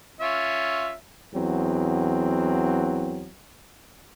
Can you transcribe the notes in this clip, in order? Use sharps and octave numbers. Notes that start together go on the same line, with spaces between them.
C#4 F4 E5
E2 F#3 C4